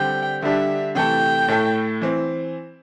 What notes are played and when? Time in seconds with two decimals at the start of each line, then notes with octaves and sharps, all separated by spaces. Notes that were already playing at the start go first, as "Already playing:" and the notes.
Already playing: D3 G3 C4 G4 G5
0.42 D3 G3 D4 G4 E5
0.95 C3 E3 A3 E4 A4 G5
1.48 A2 A3 E4 A4
2.02 E3 C4